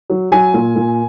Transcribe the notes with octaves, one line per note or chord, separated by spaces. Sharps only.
F#3
F#3 G#5
A#2
A#2